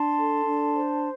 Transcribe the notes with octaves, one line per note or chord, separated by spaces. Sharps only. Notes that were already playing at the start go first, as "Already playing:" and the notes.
Already playing: D4 A5 C6
A4
D4
C5